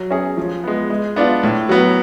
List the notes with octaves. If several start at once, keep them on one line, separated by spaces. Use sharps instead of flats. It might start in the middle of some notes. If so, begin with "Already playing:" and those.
Already playing: F#3
C#4 G#4
F3
G#3 B3
G#3
B3 D4 F4
A2
F#3 B3